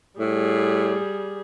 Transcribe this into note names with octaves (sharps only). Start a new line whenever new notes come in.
A2 G3 G#4